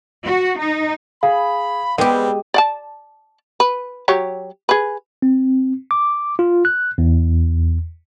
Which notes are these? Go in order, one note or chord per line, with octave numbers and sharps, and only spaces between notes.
F#4
D#4
G#4 F5 B5
G3 G#3 B3 C4 G4 G5
D5 F#5 A5
B4
F#3 G4 C#5
G#4 B4
C4
D6
F4
F#6
E2